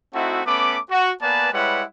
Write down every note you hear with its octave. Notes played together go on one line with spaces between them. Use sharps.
A3 C4 D#4 E4 F#4
A3 B3 C#4 B5 D6
F#4
A#3 B3 B4 D5 G#5 A5
G3 G#3 E4 B4 C#5 F#5